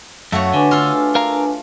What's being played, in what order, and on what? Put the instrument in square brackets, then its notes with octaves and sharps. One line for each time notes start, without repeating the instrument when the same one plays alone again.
[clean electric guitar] F#2 [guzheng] A3 F#4 C#5 [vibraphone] F5 E6
[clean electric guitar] D3 [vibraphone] D4 B4 G#5
[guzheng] F4 A4
[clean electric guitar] A#4 F5 A#5